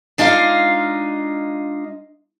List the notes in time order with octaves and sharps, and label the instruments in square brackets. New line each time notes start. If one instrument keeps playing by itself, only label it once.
[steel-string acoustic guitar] G#3 D4 D#4 F4 F5